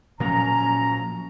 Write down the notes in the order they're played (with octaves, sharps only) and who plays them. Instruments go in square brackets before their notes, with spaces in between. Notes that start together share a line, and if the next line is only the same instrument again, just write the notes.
[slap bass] A#2 F3 F#3 [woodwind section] C#4 A#5